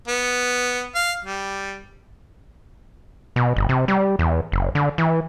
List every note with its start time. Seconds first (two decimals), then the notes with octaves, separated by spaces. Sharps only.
0.08 B3
0.95 F5
1.24 G3
3.36 B2
3.56 G1
3.69 C3
3.88 G3
4.19 E2
4.52 F#1
4.75 D3
4.98 E3